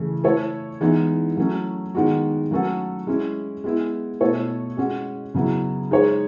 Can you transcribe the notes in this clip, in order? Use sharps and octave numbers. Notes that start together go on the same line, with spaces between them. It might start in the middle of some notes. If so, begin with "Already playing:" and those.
Already playing: C#3 E3 A3
A3 E4 A4 C#5
E3 G#3 B3 D#4
F#3 A3 C#4
D#3 G#3 B3 F#4
F#3 A3 C#4 F#4 A4
G#3 C#4 E4
G#3 B3 E4
B2 A3 E4 A4 C#5
G#3 C#4 F#4
C#3 F#3 B3 E4
G#3 D#4 G#4 C#5